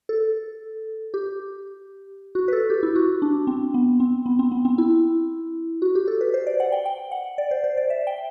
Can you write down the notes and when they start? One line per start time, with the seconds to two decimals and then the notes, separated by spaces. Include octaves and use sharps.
0.09 A4
1.14 G4
2.35 F#4
2.48 B4
2.53 A4
2.70 G4
2.83 E4
2.96 F#4
3.22 D4
3.47 C4
3.74 B3
4.00 C4
4.26 B3
4.39 C4
4.52 B3
4.65 C4
4.78 E4
5.82 F#4
5.95 G4
6.08 A4
6.21 B4
6.34 C5
6.47 D5
6.60 F#5
6.72 G5
6.86 G5
7.12 F#5
7.38 D5
7.51 C5
7.64 C5
7.77 D5
7.90 E5
8.07 G5